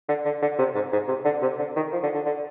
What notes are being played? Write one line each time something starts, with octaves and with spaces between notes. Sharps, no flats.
D3
D3
D3
C3
G#2
G#2
C3
D3
C3
D3
D#3
F3
D3
D3
D3